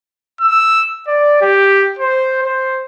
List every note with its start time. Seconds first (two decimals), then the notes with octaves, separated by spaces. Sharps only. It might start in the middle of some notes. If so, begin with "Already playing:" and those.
0.41 E6
1.08 D5
1.42 G4
1.99 C5
2.43 C5